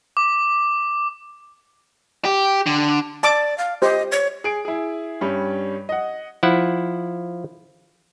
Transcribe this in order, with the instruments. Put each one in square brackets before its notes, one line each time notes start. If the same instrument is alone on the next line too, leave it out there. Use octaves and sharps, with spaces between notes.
[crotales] D6
[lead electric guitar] G4
D3
[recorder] D5 [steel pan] A5 D6
[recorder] F5
[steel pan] G4 C5 [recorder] D#5
[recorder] C#5
[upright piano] G#4 D7
E4 G#4
G2 G3 C#4
D#5 F#5
[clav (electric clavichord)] F3 E4 F#5